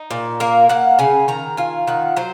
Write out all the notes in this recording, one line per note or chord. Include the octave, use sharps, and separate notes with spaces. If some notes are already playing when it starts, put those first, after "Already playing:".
Already playing: D#4
A#2
A#3 A#4
A#3 F#5
C#3 G#5
D#3 A#5
F4 G#5
D#3 F#5
F#3 C5